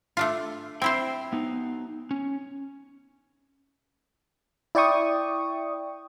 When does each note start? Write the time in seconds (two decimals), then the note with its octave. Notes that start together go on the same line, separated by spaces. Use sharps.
0.17 A3 D4 F4
0.82 C4 E4 C5 G5
1.33 B3 D#4
2.11 C#4
4.75 E4 D5 G5 C#6 D#6